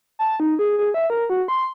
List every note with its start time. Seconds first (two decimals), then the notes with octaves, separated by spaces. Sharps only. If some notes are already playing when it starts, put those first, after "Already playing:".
0.19 A5
0.40 D#4
0.59 G#4
0.78 G#4
0.94 E5
1.10 A#4
1.30 F#4
1.48 C6